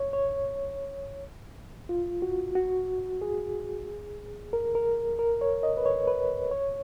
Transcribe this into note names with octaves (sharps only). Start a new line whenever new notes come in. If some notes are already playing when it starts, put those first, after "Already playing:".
Already playing: C#5
C#5
F4
F#4
F#4
G#4
A#4
A#4
A#4
C#5
D#5
B4
C#5
B4
C#5